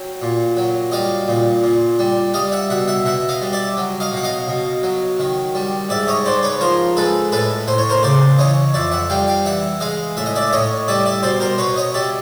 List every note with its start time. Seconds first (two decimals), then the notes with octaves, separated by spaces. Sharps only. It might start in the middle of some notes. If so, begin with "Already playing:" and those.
Already playing: F#3 G5
0.22 A#2
0.57 F#3
0.92 G3 D#5 F5
1.28 A#2
1.63 A#2
1.99 G3
2.34 G3 D#5 F5
2.52 E5 F#5
2.70 B2 E5 F#5
2.88 E5 F#5
3.05 B2 E5 F#5
3.29 D#5 F5
3.42 G3
3.53 D5 E5
3.77 F#3
4.00 D#5 F5
4.12 B2 F#5
4.23 D#5 F5
4.48 B2
4.83 F#3
5.19 D#3
5.55 G3
5.89 G#2 D5 E5
6.08 C#5 D#5
6.26 G#2 C5 D5
6.43 B4 C#5
6.61 F3 A#4 C5
6.97 G#3 A4 B4
7.32 A2 A4 B4
7.67 A2 C5
7.78 C#5
7.90 A#4 C5
8.03 C#3 C5 D5
8.38 E3 C#5 D#5
8.74 F2 D5 E5
8.92 E5 F#5
9.10 G3 F5 G5
9.27 F5 G5
9.45 E3 E5 F#5
9.80 G#3 D#5 F5
10.17 A2 E5
10.26 D#5
10.36 D5 E5
10.53 A2 C#5 D#5
10.88 G3 D5 E5
11.06 D5 E5
11.23 B2 C5 D5
11.40 A#4 C5
11.58 B2 B4 C#5
11.76 C#5 D#5
11.94 G3 D5 E5